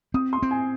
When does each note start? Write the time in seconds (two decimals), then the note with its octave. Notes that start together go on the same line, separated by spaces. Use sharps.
0.14 C4 D#6
0.33 C6
0.43 C4
0.51 G#5